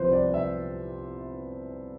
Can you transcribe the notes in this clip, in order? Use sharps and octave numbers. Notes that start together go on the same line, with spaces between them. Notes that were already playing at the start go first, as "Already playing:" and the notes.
Already playing: C2 C3 F3 B4 C5
D5
E5